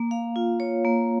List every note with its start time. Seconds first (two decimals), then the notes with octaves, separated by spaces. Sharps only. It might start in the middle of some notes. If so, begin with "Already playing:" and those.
Already playing: A#3
0.11 F5
0.36 F4
0.60 C#5
0.85 A#3